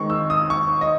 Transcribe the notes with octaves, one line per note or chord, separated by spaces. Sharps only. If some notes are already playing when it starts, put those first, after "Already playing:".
Already playing: D#3 G#3 C4 C#6
E6
D#6
C#6
D#5